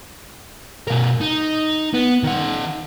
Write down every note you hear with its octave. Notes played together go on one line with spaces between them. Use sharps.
B2 A#4
D#4
B3
D#3 F#5